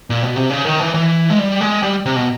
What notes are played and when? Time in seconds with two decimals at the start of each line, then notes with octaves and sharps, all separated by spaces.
0.10 A#2
0.23 B2
0.36 C3
0.50 C#3
0.65 D#3
0.80 E3
0.94 E3
1.30 G#3
1.39 G3
1.61 G#3
1.83 G3
2.06 C3
2.16 B2